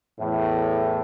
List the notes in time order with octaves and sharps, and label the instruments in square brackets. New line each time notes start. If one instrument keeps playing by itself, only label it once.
[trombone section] E2 A2